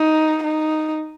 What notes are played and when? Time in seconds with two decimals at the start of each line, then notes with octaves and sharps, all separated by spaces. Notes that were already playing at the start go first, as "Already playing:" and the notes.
Already playing: D#4
0.43 D#4